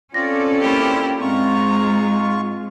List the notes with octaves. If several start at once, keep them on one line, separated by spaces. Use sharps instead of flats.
C4 C#4 F4 A4 D5 A#6
A#3 E4 G4
G#2 G#3 C4 F4 A#5 C#6